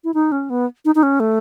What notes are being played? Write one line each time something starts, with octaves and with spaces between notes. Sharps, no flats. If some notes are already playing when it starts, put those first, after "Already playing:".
E4
D#4
C#4
B3
D#4
D#4
C#4
A3